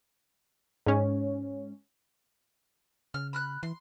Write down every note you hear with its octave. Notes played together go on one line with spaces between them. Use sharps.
G#2 C#4
C#3 F6
B5 F6 F#6
E3 C6